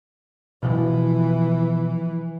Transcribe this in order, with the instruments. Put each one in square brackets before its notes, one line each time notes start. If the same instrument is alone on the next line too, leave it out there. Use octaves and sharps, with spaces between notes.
[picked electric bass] B2 F3 [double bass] E3